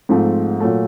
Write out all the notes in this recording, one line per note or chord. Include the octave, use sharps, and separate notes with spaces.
G#2 F3 A3 C4
A#2 F#3 A3